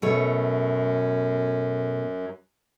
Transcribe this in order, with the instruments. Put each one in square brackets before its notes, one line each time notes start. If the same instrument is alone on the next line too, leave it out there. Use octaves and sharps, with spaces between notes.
[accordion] F#2 [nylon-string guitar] B2 A3 C#5